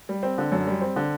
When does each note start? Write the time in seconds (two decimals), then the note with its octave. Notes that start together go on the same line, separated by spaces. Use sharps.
0.09 G3
0.23 C4
0.38 D3
0.52 F#2
0.67 G3
0.81 C4
0.96 D3